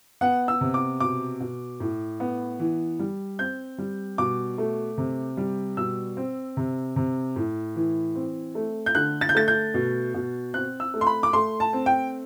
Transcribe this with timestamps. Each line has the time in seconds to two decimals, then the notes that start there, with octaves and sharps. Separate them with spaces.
0.21 B3 F#5
0.48 E6
0.61 C3
0.74 D6
1.00 B2 D6
1.40 B2
1.80 A2
2.20 B3
2.60 E3
2.99 G3
3.39 C4 G6
3.78 G3
4.18 B2 D6
4.58 A3
4.98 C3
5.37 G3
5.77 B2 E6
6.17 C4
6.57 C3
6.96 C3
7.36 A2
7.76 E3
8.15 C4
8.55 A3
8.86 G6
8.95 D3 F#6
9.21 A6
9.29 G6
9.35 A3 A6
9.48 G6
9.74 B2
10.14 B2
10.54 C4 F#6
10.80 E6
10.94 A3
11.01 C6
11.07 B5
11.23 D6
11.33 A3 C6
11.60 A5
11.73 C4
11.86 G5